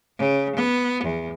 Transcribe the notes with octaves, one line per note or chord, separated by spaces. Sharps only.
C#3
B3
E2